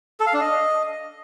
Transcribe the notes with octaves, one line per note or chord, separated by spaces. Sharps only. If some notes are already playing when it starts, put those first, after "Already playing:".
A4
F5
D4
D#5